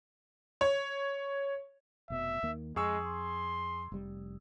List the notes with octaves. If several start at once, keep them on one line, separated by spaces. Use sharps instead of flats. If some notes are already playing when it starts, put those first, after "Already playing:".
C#5
F1 B2 E5
D#2 D#3 A#3
F2 G#3 G#4 C#6 E6
C6
F1 G3